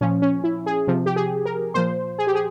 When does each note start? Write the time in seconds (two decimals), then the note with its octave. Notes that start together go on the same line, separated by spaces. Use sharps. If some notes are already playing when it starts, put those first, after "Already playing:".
0.01 A#2 F3 C#4
0.22 C#4
0.44 E4
0.66 G#4
0.88 C3 F3
1.06 G4
1.16 G#4
1.45 A#4
1.74 A#2 F3 C5
2.18 G#4
2.27 G4
2.35 G#4